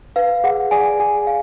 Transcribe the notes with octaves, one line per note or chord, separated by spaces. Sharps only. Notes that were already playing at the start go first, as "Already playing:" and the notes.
B4 F5
G#4 F#5
G#4 D5 G#5
G#4 G#5
F5